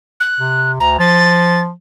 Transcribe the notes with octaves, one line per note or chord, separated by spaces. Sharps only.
F#6
C3
D2 A#5
F3 A6